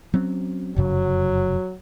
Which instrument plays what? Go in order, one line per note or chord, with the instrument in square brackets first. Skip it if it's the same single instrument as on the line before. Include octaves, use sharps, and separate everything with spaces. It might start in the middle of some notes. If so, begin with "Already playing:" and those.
[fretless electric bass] F#3 C4 C#4
[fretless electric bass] F1 F#2 C#3 [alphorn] F#3